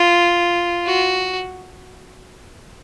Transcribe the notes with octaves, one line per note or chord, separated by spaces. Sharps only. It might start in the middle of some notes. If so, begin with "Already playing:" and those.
Already playing: F4
F#4